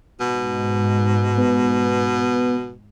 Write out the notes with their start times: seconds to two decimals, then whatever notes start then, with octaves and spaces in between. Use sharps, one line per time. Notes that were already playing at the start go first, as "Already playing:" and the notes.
0.20 G#2 B2
1.37 B3